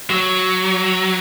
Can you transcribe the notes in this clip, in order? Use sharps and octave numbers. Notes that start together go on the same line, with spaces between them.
F#3